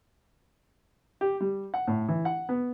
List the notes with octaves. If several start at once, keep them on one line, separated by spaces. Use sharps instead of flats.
G4
G3
F#5
A2
E3
F#5
B3